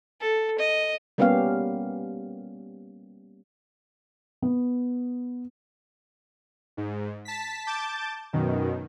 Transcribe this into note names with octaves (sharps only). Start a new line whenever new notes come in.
A4
D#5
G3 A#3 B3 C#4 G4 F5
B3
G#2
A5 B6
A5 D6 G6 A6
F#2 B2 D#3